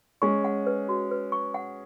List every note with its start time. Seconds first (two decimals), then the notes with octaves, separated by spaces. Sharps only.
0.22 G#3 C#4 C#6
0.44 F#5
0.67 B4
0.89 F#4
1.11 B4
1.32 C#6
1.54 F#5